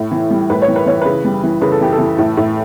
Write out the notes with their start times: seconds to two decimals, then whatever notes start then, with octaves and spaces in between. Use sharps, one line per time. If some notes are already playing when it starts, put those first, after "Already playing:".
Already playing: A2
0.12 E3
0.31 G3
0.50 A2 B4
0.62 C#5
0.68 E3
0.76 B4
0.86 E3 C#5
1.02 C#3 B4
1.25 G3
1.43 E3
1.62 C#3 B4
1.72 A4
1.81 E3 G4
1.92 A4
1.99 E3
2.18 A2
2.37 A2